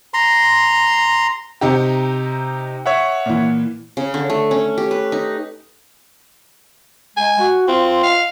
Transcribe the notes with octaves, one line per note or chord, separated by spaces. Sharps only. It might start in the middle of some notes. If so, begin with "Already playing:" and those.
A#5 C6
C3 D#4 G4
C#5 E5 F#5
A#2 E3
C#3
D3
A3
C#4
G4
B4
D#4
G#3 G#5
F#4
C4 F4
F5